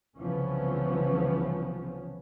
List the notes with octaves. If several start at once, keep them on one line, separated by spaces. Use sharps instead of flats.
C2 C#3 E3 F3 B3 C#4